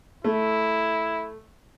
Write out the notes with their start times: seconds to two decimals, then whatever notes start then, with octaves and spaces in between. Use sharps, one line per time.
0.24 A3 E4